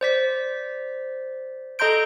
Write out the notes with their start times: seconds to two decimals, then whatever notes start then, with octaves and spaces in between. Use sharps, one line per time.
0.01 C5 D5 B6
1.79 A4 D#5 A#5 C6 G6 D7